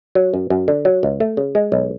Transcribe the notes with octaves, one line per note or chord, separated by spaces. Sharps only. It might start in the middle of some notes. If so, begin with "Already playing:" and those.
F#3
F#2
F#2
D3
F#3
C#2
A3
C#3
G#3
B1